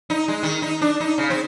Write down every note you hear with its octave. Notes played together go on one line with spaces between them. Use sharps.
D#4
G#3
D#3
D#4
D4
D#4
C#3
C4